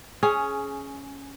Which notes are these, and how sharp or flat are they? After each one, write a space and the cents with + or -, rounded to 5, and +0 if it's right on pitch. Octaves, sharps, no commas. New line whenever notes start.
C#4 +0 G#4 +15